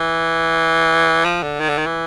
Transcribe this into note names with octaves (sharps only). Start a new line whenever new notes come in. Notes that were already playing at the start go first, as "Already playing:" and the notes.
Already playing: E3
F3
D3
D#3
D3
D#3
E3